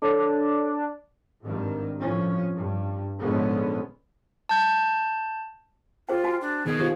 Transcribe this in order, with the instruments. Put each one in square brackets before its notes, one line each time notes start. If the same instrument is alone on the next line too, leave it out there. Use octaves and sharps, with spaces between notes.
[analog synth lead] D4 [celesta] A4 C#5
[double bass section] G#1 G2 D#3
C2 A2 F3 C#4
G2
A#1 G#2 D3 G#3 B3 C#4
[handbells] A5 G6
[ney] F4 [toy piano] G#4 C5 G5
[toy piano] F#4 G#5
[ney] D4
[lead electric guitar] B2 B3 [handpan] D#3 [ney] G#4
[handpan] D#3 F4 [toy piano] G4 C5